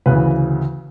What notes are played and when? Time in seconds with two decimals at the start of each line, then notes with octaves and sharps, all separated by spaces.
0.06 D2 C#3 E3 B4